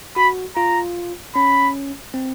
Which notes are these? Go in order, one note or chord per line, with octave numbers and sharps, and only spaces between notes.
F#4 B5
F4 A#5
C#4 B5
C4